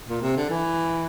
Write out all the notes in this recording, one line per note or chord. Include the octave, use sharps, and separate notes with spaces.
A#2
C3
D3
E3